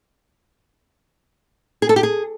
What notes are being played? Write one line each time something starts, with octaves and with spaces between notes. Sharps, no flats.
G#4
A4
G4
G#4